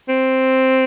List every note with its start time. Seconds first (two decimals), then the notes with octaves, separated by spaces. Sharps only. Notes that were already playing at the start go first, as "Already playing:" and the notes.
0.09 C4